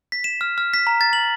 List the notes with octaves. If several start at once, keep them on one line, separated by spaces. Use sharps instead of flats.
B6
E7
F6
F6
B6
A#5
A6
F#7